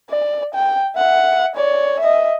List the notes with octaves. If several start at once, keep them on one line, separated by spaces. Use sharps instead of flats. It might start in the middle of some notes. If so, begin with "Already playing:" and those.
D5
G5
E5 F#5
C#5 D5
D#5 E5